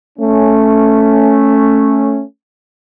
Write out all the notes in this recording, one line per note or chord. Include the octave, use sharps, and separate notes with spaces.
A3 C#4